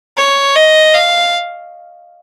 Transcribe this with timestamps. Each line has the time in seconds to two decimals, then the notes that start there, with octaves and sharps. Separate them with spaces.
0.17 C#5
0.55 D#5
0.94 F5